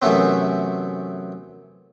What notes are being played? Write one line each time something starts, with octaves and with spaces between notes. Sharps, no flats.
F#2 C3 E3 A3 B3 C4